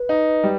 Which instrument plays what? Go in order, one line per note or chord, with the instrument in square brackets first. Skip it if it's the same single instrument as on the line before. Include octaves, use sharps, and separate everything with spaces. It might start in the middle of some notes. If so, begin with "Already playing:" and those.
Already playing: [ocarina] B4
[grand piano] D#4
G3